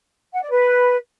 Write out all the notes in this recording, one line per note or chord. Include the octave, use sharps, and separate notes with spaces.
F#5
D5
B4